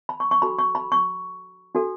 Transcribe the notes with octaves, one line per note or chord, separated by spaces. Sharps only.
B5
C#6
C#6
D4 F#4 A4 B5
C#6
B5
C#6
D4 F#4 A4